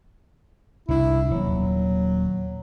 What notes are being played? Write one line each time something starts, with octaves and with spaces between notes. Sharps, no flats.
C2 D4 E4
D#1 F#3